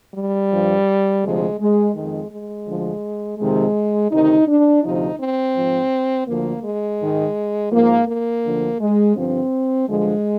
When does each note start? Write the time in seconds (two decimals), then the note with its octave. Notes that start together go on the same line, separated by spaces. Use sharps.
0.14 G3
0.50 G2 F3
1.22 D2 C3 F3 G#3
1.59 G#3
1.94 F2 D#3 G#3
2.31 G#3
2.67 D2 D3 F3
3.38 F2 C3 D#3 G#3
4.11 D2 C3 D#3 D#4
4.47 D4
4.83 D2 C3 F3 D#4
5.18 C4
5.56 G#2 F3
6.27 D2 D3 F3 A#3
6.63 G#3
6.99 G#2 D#3
7.71 G#2 F3 A#3
8.07 A#3
8.44 D2 D3 F3
8.80 G#3
9.15 G2 D3 F3 C4
9.87 G2 D3 F3 G#3